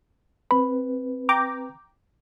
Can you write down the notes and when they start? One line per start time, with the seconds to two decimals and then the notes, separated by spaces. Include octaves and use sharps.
0.51 C4 B4 B5
1.29 G5 A#5 D6